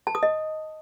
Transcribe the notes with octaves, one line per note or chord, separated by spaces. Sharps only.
A5
D#6
D#5